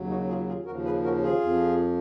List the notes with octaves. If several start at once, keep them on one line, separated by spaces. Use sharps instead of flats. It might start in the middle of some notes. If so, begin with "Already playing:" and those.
Already playing: D#2 C#3 F#3
D#4 F#4
F4 G#4
F4 G#4
D#2 C#3 F3 F#4 A#4
G#4 B4
F#4 A#4
F4 G#4
F2 F3